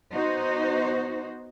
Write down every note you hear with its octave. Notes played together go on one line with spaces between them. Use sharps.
B3 D#4 F#4 C5